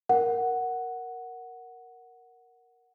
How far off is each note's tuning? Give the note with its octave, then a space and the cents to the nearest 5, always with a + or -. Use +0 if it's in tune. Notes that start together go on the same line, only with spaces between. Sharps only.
A#4 +0 F#5 +0